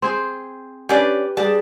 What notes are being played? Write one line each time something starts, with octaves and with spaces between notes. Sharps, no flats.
C4 G#4 C5 C6
C#4 D4 G4 B4 D5
G3 D4 G#4 A5